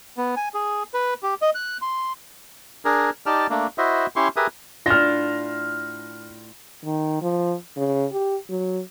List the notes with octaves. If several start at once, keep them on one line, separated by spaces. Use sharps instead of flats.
B3
G#5
G#4
B4
G4
D#5
F#6
C6
D4 G#4 A#4
D#4 G4 D5 A5 F6
A3 A#3 D4
E4 F#4 C5 D#5 E5
C#4 E4 G4 C6 C#6
G4 G#4 A#4 B4 E5 D#6
A2 D4 F4 F6 A#6
D#3
F3
C#3
G4
F#3